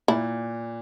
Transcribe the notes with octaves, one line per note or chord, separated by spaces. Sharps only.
A#2 E4